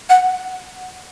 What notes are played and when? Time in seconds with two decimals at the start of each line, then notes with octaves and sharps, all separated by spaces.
0.09 F#5